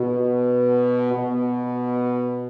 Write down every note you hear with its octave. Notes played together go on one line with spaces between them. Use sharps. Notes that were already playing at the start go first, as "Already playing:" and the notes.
Already playing: B2
B2